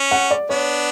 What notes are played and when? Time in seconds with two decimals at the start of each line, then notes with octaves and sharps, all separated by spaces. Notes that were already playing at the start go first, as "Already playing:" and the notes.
Already playing: C#4
0.11 F#5
0.31 D5
0.49 B3 D4 C#5